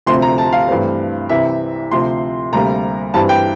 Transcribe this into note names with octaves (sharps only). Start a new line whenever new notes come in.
D2 C3 F3 C4 C6
A#5
A5
F5
G2 E3 A3 C4
C2 C3 E3 E5
D2 C3 F3 C4 C6
D2 C3 G3 A#3 A#5
G2 E3 G3 C4 A5
G5